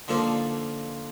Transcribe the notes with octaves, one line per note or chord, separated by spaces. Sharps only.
D3 F3 A#3 D#4 A4 C5